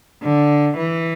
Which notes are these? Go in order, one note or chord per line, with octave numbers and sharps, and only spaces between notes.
D3
E3